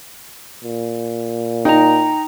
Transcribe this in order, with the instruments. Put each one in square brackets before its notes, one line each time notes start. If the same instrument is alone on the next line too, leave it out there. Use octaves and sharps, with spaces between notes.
[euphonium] A#2
[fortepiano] D#4 [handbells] G5 A#5